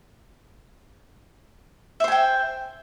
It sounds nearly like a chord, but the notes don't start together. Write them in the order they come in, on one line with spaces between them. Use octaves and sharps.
E5 C5 G#5 G5